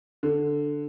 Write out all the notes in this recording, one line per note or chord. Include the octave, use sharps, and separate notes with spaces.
D3